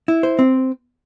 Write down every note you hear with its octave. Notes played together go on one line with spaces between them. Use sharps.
E4
C5
C4